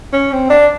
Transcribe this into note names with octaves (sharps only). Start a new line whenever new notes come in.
C#4
C4
D4